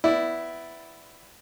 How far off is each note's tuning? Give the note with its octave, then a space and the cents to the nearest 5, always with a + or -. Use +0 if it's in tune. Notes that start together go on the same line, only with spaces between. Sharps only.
B3 +20 E4 +0 D5 -5